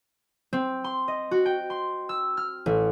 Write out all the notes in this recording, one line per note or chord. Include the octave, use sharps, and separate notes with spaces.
C4
C6
D#5
F#4
G5
C6
E6
F6
A1